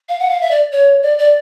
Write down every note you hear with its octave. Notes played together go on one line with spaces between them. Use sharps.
F5
F#5
F5
E5
D5
C#5
D5
D5